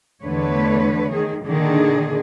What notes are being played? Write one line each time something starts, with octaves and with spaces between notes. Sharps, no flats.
E2 D3 A3 B4 C#5
D#3 G#4
A#2 D3 D#3 D4 G#4